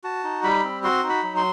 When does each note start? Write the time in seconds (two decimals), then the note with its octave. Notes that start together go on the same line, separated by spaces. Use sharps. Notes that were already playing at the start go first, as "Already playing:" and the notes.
0.04 F#4 A5
0.24 D#4
0.43 G3 B5
0.64 C4
0.84 F#4 C6
1.03 D#4
1.09 B5
1.23 F#3
1.36 C6